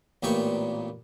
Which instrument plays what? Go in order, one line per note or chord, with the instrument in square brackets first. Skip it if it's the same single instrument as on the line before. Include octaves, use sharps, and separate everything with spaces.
[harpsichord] A1 A#2 B3 G5 A#5 C#6